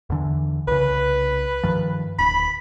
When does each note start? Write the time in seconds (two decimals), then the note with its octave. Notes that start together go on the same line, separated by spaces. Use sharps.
0.10 E2 D3 E3
0.68 C2 C#3 B4
1.63 G2 D#3 F3
2.19 D1 B5